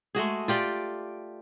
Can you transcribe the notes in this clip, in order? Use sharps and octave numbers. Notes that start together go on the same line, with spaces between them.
G#3 A3 F#4 G#4
F4 G4 D5 G5